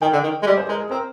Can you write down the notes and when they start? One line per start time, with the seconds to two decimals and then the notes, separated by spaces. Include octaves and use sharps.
0.02 D#3 G5
0.13 D3
0.23 D#3
0.42 G#3
0.46 G3 D#5
0.58 C5
0.64 G#4
0.68 G#3 A#4
0.80 G#4
0.91 C4 A#4